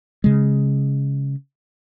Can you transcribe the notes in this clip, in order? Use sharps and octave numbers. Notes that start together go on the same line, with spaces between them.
C#3 G#3